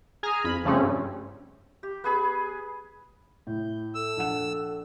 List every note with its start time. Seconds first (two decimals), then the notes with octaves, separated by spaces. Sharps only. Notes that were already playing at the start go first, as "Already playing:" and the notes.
0.23 G#4 G#5 A#5 F6
0.44 F2 B5
0.65 C#3 F3 G3 A3 C4 C#4
0.83 G2
1.83 G4
2.04 B3 G#4 B5
3.47 A2 G6
3.95 A4 E6
4.17 A#1 F#5 E7